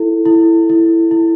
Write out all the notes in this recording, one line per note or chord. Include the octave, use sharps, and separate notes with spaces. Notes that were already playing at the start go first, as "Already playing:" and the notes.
Already playing: E4 A4
E4
E4
E4